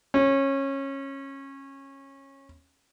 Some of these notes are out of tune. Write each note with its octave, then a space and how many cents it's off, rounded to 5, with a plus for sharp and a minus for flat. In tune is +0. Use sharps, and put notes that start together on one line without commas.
C#4 -20